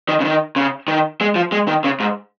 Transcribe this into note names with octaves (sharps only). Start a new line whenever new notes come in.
D#3
C#3
D#3
C#3
D#3
G#3
F3
G#3
D#3
C#3
G#2